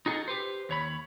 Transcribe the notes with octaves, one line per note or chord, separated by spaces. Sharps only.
D#4 F4 F#4 G#4 A4 D#5
G4 B4 C5
D#2 C#5 B5